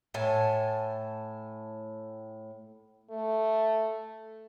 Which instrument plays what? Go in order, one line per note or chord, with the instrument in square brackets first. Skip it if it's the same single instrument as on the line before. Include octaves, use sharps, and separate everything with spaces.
[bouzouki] A2 G#5 A5
[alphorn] A3